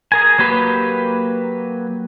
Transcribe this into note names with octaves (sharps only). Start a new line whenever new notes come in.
G#4 A#4 G#5
F#3 A#3 G4 B4